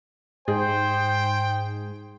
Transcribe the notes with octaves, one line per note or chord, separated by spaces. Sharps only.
G#2 G#4 C5 G5